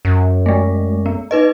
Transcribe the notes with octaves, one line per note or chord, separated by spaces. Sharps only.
F#2
G#3 A3
B3
D#4 B4 D#5